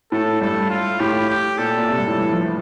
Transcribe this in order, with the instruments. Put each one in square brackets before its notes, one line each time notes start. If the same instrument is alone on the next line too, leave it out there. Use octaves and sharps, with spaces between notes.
[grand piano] A2 [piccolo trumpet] A4
[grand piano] G2 [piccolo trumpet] A4
[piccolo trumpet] F4
[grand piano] A2 [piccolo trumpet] G4
[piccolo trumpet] G4
[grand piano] A#2 [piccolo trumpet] A4
[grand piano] A#2
C3
G2
A2
E3
F3